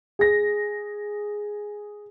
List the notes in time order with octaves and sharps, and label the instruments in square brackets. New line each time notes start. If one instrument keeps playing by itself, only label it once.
[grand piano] G#4 A#6